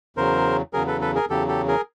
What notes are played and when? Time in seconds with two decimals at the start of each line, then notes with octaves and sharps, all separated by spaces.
0.17 E2 C#3 F#3 A#4 C5
0.73 E2 C#3 F#3 G#4 A#4
0.87 A4 B4
1.01 A4 B4
1.15 G#4 A#4
1.30 E2 C#3 F#3 G4 A4
1.48 G4 A4
1.68 G#4 A#4